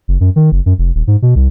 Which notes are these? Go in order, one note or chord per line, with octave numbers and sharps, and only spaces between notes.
F#1
F#2
D#3
F#1
F#2
F1
D#1
G#2
B2
C2